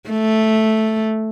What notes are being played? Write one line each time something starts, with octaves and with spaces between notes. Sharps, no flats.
A3